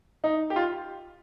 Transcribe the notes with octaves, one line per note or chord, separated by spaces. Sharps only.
D#4
G4
F4